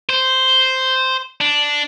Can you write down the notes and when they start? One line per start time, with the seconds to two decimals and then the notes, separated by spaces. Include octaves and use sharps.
0.09 C5
1.41 D4